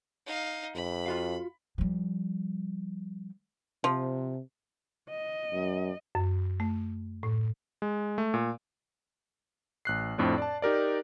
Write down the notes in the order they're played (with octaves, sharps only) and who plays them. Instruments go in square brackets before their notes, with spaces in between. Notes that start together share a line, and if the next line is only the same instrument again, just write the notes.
[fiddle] D#4 F5
[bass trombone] F2 [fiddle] B5
[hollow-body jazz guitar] F4 F#4 F5
[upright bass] F3 G3
[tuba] C3 [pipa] F3
[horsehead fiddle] D#5
[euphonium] F#2
[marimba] F#2
A3
A2
[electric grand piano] G#3
A3
A#2
A1 F#6 C7
F2 A2 C4 D4
D5 A5
D#4 G4 A#4 D5